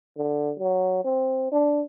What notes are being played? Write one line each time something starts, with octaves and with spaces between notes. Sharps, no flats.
D3
F#3
C4
D4